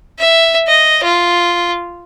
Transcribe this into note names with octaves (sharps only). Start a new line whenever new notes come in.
E5
D#5
F4